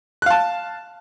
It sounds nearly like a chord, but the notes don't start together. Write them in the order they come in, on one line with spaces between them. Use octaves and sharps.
F#6 F5 A5